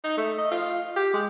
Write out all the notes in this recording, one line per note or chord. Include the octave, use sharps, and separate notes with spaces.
D#4
A3
D#5
F4
G4
G#3